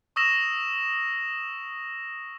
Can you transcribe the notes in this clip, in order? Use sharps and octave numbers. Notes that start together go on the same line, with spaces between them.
C#6 D#6 E6 A#6 E7